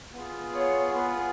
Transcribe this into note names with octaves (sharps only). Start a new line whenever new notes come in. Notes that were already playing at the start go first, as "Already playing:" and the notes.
B3 F4 G#4
C#5
B3 F4 G#4 B4